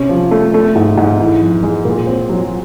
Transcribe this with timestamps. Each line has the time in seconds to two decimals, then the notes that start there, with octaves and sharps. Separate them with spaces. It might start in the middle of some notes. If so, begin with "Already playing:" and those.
Already playing: C3 C#4
0.09 F3
0.31 A3
0.54 A3
0.76 G#2
0.97 G#2
1.20 E3
1.42 F2
1.63 G#3
1.85 A#2
2.07 C4
2.29 F#3